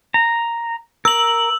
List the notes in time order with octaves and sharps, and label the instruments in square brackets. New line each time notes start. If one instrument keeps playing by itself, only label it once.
[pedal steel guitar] A#5
[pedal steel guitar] A#4 [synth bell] E6 F#7